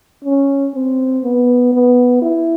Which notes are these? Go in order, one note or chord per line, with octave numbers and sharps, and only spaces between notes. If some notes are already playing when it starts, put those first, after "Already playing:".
C#4
C4
B3
B3
E4